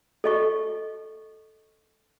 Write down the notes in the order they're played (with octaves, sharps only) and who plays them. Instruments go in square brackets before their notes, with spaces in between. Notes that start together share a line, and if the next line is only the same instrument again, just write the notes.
[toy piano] A4 D#5 C#6